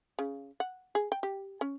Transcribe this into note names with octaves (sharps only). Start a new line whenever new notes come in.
C#3
F#5
G#4
G5
G4
C#4